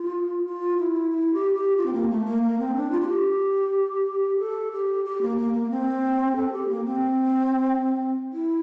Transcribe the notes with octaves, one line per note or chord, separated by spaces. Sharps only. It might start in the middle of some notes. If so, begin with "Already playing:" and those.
Already playing: F4
F4
E4
E4
G4
G4
F4
C4
A#3
A3
A#3
A#3
C4
D4
F4
F4
G4
A4
G4
G4
A#3
A#3
A#3
C4
A4
G4
A#3
C4
E4